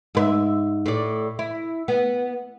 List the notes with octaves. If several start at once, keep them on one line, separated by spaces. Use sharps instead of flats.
G#2 B4 E5
A2 D5
E4
B3